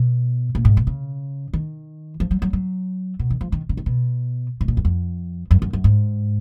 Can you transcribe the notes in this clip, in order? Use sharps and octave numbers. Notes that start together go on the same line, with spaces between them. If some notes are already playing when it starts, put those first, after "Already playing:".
Already playing: B2
A#2
G#2
B2
C#3
D#3
F3
F#3
F#3
F#3
B2
D#3
F3
D#3
C#3
D#3
B2
G#2
A#2
F#2
F2
F#2
F#2
F#2
G#2